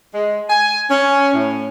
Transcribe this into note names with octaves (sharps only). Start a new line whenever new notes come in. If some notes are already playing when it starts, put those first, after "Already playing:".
G#3
G#5
C#4
A2